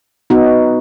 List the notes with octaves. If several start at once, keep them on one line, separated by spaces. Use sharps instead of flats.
B3 D#4 F#4